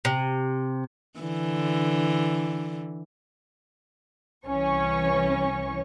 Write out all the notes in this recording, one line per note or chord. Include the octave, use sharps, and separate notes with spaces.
C3
D3 E3
C2 E3 C#4 C#6